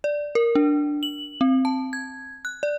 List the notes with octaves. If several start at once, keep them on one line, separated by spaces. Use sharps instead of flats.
D5
A#4
D4
F#7
C4
A5
G#6
F#6
D5